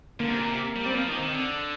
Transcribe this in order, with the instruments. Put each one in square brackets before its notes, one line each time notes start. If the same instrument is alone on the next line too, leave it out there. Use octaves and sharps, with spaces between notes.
[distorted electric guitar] D3 [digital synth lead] A#3
[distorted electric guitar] C3
A#2
C3
G3
[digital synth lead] C4
[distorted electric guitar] F3 [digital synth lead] A#3
[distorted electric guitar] D#3
[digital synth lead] C4
[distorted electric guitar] D#3
D3